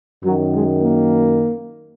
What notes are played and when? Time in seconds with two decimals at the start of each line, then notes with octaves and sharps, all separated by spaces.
0.23 F#2 F#3
0.28 D#3
0.53 G#3
0.83 A#3